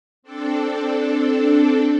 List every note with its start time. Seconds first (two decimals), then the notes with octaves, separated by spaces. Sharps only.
0.22 C4 D4 A4